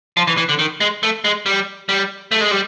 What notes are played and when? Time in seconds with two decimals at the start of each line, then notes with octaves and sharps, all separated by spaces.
0.17 F3
0.27 E3
0.37 E3
0.49 D3
0.59 D#3
0.80 G#3
1.03 A3
1.24 G#3
1.46 G3
1.89 G3
2.31 A3
2.41 G#3
2.51 G3